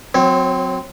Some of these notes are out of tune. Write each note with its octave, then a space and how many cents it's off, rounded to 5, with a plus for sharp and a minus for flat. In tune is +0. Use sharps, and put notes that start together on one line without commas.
F#3 -20 C4 -15 C#5 -45